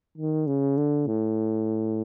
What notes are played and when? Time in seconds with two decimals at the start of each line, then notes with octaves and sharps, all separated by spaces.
0.18 D#3
0.47 C#3
0.77 D3
1.07 A2